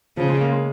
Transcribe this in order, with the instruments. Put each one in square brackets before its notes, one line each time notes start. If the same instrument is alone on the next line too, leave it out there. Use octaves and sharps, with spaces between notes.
[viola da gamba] C#3 [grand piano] F3
[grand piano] G#3
A#3
G#3